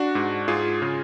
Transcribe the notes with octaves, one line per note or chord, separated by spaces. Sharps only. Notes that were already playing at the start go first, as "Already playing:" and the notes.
Already playing: D4 F#4
G#2
G#2 F4 G#4
C#3